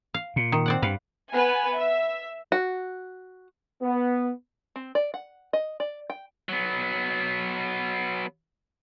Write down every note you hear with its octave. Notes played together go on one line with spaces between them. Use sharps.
F5
A#2
D#3
C4 D5 F#5
G2 B4 F5
B3 B4 G#5
E5
F#4
B3
C4
D5
F#5
D#5
D5
G5
F#3 B3